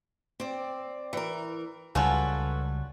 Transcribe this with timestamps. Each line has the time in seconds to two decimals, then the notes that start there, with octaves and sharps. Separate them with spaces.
0.40 C4 D5
1.13 E3 A#4
1.95 C#2 C#3 G3 F4 F#4 A4 B4 C#5